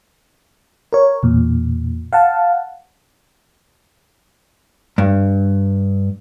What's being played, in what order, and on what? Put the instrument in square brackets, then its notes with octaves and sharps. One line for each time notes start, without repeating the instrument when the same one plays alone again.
[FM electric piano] A#4 C#5
E2 A#2
F5 F#5 A5
[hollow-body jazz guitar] G2